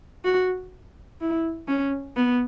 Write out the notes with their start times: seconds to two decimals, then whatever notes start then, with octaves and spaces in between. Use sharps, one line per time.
0.25 F#4
1.21 E4
1.68 C#4
2.16 B3